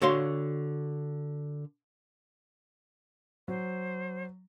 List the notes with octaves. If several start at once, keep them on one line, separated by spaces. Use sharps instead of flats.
D3 F#4 C#5 F5 C6
F#3 C5